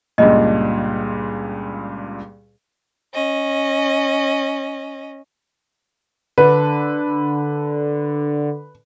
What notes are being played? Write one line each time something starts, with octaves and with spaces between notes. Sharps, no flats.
C#2 G2 A#2 D#5
C#4 D#5
D3 B4